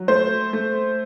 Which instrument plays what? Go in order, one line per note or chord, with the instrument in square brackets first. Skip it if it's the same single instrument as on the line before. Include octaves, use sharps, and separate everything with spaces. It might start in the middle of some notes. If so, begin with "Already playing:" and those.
Already playing: [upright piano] F#3
A3 C5
A3